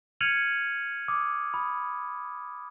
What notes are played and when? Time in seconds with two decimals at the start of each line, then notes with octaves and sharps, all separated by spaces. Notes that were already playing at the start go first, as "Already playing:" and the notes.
0.21 F6 G#6 C#7 D#7 F7 F#7
1.08 D6 D#6
1.54 B5 D#6